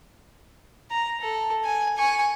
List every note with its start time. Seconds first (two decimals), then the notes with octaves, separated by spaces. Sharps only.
0.91 A#5
1.21 A4
1.65 G#5
1.97 G#5 C#6